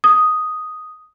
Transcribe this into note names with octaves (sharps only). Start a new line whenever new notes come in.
D#6